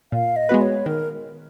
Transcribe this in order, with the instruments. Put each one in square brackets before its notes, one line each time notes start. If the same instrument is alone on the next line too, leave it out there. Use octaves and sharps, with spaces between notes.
[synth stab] A#2 [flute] F5
[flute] D#5
[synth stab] G#3 B3 F#4 B4
[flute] C#5
[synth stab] D#3 [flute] A#4